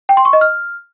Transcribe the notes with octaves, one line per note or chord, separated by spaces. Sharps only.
G5
C6
C#6
D#5
F6